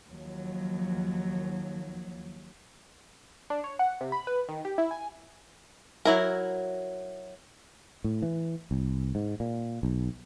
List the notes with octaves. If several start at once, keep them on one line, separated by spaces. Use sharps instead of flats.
D#2 F3 F#3
D4
C#5
F#5
C3
B5
B4
D#3
G4
E4
G#5
F#3 E4 A#4
A2
E3
C2
G#2
A#2
B1